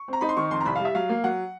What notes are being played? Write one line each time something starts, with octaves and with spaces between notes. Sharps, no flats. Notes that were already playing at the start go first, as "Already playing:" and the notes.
Already playing: C#6
C4 A#5
D#4 B5
C6
D#3 C#6
F2 C6
A#5
C2 B5
G3 F5
E5
F#3 F5
A#3
F#3 F#5